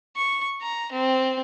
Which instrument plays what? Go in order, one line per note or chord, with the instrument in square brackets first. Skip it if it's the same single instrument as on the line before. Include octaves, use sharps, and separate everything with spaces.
[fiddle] C#6
A#5
C4